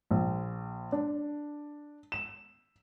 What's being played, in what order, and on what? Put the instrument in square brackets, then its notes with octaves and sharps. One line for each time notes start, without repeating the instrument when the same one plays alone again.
[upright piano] A#1
D4
E7